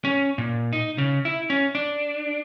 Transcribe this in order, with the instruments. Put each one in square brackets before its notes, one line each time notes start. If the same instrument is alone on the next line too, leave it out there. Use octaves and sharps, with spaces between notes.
[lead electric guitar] C#4
A#2
D#4
C#3
E4
C#4
D4